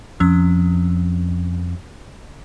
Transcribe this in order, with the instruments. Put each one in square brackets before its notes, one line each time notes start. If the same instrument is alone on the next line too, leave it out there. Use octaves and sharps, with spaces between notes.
[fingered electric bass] F2 [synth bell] F3 C#4 E6